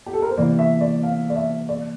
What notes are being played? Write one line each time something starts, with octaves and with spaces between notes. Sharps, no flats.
G4
A4
A#4
C5
C3 E3 A#3 D5
E5
D5
F5
D5
E5
D5